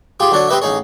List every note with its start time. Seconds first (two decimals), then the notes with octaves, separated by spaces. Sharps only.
0.20 F4 G4 G#4 G5
0.32 D3 F#3 D4 C#5 D5
0.49 C4 G4 B4 D#5 E5
0.62 A1 D#4 G#4 C#5